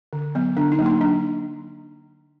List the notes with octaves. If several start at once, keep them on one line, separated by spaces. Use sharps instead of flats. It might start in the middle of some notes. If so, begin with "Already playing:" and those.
D3
F#3 B3
D3 D4
D#4
F#3 A#3
D#4
F#3 D4